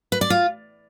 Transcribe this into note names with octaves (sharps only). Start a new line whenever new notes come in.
B4
D5
F4